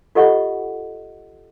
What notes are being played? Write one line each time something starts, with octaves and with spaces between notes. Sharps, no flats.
F4 G4 A4 D#5 F#5 C#6